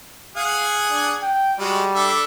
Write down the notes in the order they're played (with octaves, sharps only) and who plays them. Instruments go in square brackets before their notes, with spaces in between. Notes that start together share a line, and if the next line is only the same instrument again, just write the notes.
[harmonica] G#4 F#5 G#5 [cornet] F5
[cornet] D4
G5
[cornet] G3 [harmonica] G#3 F#4
[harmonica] D4 A4 E5